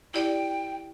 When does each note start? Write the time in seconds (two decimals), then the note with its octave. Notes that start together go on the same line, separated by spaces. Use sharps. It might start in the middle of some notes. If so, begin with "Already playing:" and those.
0.14 E4 G4 D5 G5